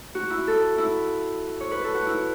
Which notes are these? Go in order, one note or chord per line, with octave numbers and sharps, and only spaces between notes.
F#4
E4
A4
E4
C#5
B4
A4
F#4
E4